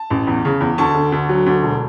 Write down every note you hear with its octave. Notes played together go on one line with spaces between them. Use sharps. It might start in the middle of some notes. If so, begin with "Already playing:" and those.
Already playing: A5
A1
E2
C#3
E2
D2 A5 C#6
D3
D2
F#3
D2
E1